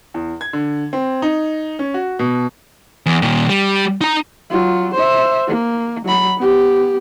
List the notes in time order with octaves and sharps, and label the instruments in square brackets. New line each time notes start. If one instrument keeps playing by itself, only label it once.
[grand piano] E2
G#6
D3
C4
D#4
C#4
F#4
B2
[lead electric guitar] E2
A#2 D#3
G3
D#4 A#5
[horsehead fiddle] F#3 F4
C5 E5
A#3
F#3 B5
B3 G4